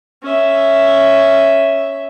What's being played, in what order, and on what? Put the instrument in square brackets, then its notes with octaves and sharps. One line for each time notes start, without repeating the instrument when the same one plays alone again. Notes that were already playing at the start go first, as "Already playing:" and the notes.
[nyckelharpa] C#4 E5